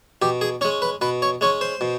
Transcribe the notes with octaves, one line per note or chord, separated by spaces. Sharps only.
B2 G4
G#4
G#3 C#4 C#5
B4
B2 B4
C#5
G#3 C#4 C#5
C5
B2